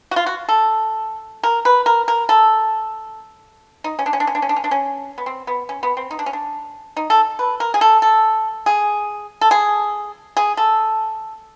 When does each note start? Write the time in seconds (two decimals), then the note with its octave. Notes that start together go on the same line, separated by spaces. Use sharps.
0.11 F#4
0.16 F4
0.26 F#4
0.48 A4
1.43 A#4
1.65 B4
1.86 A#4
2.08 A#4
2.29 A4
3.84 D#4
3.99 C#4
4.06 D4
4.13 C#4
4.20 D4
4.27 C#4
4.35 D4
4.42 C#4
4.49 D4
4.56 C#4
4.64 D4
4.71 C#4
5.18 B3
5.26 C4
5.47 B3
5.69 C#4
5.83 B3
5.97 C4
6.11 D#4
6.19 D4
6.26 C#4
6.33 D4
6.97 D#4
7.10 A4
7.39 B4
7.60 A#4
7.74 G#4
7.81 A4
8.02 A4
8.66 G#4
9.41 A4
9.51 G#4
10.37 G#4
10.57 A4